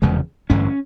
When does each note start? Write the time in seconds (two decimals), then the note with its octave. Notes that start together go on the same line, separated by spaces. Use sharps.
0.02 F1 E2 C#3 G#3
0.50 A1 G2 D3 C#4